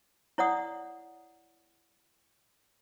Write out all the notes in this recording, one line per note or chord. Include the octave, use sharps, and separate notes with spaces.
E4 C#5 D5 F#5 D#6